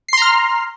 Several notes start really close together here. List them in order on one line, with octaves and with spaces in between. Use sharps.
C7 C6 A#5 F6